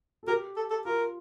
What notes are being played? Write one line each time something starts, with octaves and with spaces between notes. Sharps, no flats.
A4
G4 A#4
A4
A4
F4 A#4